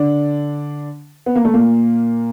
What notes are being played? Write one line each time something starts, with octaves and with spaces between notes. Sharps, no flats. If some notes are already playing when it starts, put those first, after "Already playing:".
Already playing: D3 D4
B3
A#3
A3
A#2 A#3